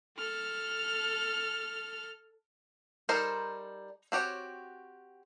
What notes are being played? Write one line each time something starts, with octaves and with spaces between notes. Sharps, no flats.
A4 F6
G3 D#4 A4 A#4 C5
C4 F#4 G4 C#5